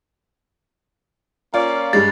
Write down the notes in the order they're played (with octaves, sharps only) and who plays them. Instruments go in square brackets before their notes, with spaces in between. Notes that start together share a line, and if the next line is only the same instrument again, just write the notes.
[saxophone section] A#3 C#4 D5 [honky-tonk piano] F4
[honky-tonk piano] G2 G3 G#3 [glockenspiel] A6